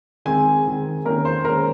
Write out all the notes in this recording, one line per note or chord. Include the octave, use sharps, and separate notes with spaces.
D#3 G#3 C4 G#5
D#3 G#3 C4
D#3 A#3 C#4 A#4
C5
D#3 G#3 C#4 A#4